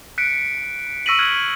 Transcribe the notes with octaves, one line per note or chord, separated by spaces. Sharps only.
F#6 B6 C#7 D7
C#6 E6 A#6 B6 D#7 F#7
F6 F#6 G#6